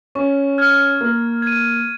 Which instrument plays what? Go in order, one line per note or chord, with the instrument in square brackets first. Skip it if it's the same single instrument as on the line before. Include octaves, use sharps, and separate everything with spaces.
[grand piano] C#4 [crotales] C#6
[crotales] F6 G#6
[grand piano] A#3 [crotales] F6
[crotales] G#6 D#7